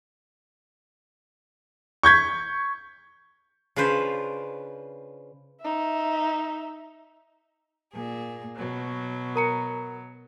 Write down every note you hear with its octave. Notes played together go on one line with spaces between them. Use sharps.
C#6 G6 G#6 B6
C#3 D4 F4 B4 C5
D#4 E5
A#2 G#4
B2 F#3
A#4 A#5 C#7